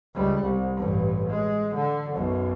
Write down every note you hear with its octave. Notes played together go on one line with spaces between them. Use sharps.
C#2 G3
C2
A1 G2
G#3
D3
B1 F#2